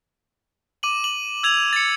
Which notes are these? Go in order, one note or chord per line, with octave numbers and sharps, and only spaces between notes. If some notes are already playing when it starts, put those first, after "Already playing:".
D6 D#7 F#7
F#7
E6 G#6 F7
A6 C#7